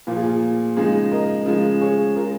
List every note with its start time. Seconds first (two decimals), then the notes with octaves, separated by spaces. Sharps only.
0.07 A#2 F3 A#3 F4
0.16 G#4
0.23 F4
0.76 C#3 F3 G#3 D#4 G#4
1.12 A#4 D#5
1.46 C#3 F3 G#3
1.81 G#4 C#5
2.15 C#3 G#3 F4 A#4